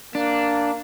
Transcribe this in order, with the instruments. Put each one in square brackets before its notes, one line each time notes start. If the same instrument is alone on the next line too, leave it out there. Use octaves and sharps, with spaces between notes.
[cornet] A#3 [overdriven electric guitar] D4